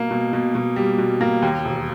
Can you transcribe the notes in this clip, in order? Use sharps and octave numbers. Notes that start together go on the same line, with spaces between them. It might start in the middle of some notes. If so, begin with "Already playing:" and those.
Already playing: B2 A#3
B2
B2
B2
G3
B2
A#3
D#2
E1